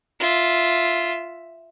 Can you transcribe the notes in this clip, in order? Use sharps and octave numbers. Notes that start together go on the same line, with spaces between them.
F4 E5